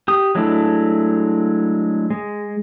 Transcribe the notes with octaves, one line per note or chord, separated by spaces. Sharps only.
G4 D#6
F#3 G#3 A3 D4 E4
G#3